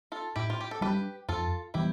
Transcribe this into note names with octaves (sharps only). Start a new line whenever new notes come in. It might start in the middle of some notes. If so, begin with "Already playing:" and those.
F4 A4
A2 E4 G4
F4
G4
A4
G3 B3 G4 B4
D4
F2 F4 A4
E3 G3 B3 E4 G4